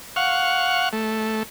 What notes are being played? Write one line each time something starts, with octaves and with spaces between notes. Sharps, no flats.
F5 F#5 C#6
A3